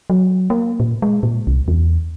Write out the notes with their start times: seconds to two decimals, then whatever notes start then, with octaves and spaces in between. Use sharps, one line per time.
0.10 F#3
0.50 A#3
0.80 A#2
1.02 G#3
1.23 A#2
1.47 C2
1.68 E2